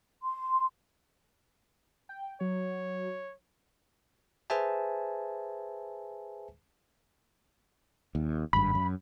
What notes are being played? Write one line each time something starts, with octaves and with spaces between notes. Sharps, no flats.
C6
G5
F#3 C#5
G#4 B4 C5 E5 G#5 A5
D#2
G#1 G2 B5
F#2